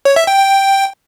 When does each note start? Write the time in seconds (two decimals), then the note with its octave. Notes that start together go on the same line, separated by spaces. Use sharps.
0.05 C#5
0.16 E5
0.27 G5
0.38 G5